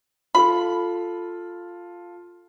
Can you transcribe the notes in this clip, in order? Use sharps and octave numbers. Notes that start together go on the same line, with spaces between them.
F4 A4 B5